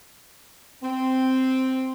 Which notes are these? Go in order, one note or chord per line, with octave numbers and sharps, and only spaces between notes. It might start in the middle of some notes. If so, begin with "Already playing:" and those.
C4